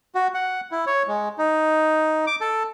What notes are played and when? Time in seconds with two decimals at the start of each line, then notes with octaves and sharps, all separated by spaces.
0.15 F#4
0.34 F#5
0.71 E4
0.86 C#5
1.08 G#3
1.38 D#4
2.27 D6
2.41 A4